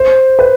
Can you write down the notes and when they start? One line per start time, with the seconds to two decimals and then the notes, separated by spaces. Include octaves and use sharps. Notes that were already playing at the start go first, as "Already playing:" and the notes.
Already playing: C5
0.39 B4